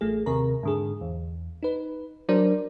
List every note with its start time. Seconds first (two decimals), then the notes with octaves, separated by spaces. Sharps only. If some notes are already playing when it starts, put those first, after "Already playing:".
0.01 A1 A3 G#4
0.26 D#2 C3 A#4 A#5
0.63 G#2 D3 G#4
1.01 E2
1.63 D#4 B4
2.29 F#3 D4 A#4 C5 D5